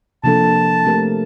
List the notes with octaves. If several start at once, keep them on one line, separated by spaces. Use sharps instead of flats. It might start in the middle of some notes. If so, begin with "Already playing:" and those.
C3 F3 A#3 D4 A4 A5
A3 C4 G4 A#4